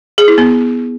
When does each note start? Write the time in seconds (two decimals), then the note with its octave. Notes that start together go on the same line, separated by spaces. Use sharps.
0.18 G#4
0.28 E4
0.38 B3